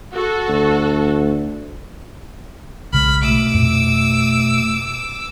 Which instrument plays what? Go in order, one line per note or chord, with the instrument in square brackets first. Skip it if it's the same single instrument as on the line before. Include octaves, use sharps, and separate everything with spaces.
[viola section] F#4 A4
[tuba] D2
[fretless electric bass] B1 C#3 G#3 [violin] B5 [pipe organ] F6
[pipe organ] B2 A3 [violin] D6 E6
[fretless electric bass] F2 A#2